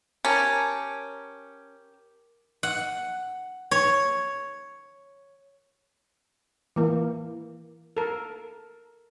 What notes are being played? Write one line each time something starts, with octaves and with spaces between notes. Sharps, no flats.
C#4 G4 A#4 A5
F#5
C#5
E3 A#3
A4 A#4